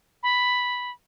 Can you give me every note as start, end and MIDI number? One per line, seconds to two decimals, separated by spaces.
0.23 0.91 83